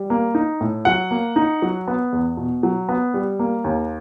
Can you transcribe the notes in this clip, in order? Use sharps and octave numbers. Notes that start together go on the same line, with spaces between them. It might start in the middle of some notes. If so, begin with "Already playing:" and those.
Already playing: G3
A#3
D#4
A2
F#3 F#5
A#3
D#4
F#3
B3
E2
B2
F#3
B3
G3
A#3
D#2